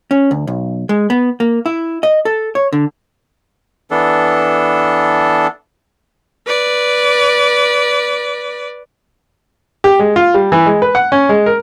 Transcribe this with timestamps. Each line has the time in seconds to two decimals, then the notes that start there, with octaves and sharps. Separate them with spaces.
0.11 C#4
0.31 D2
0.47 B1
0.89 G#3
1.10 B3
1.40 A#3
1.66 E4
2.03 D#5
2.25 A4
2.55 C#5
2.73 D3
3.91 E3 B3 D4 A4
6.47 B4 D5
9.84 G4
9.99 G#3
10.16 F4
10.34 G3
10.52 E3
10.66 G#3
10.82 B4
10.95 F#5
11.12 C#4
11.29 G#3
11.46 A#4